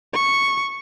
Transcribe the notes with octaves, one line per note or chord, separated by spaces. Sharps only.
C#6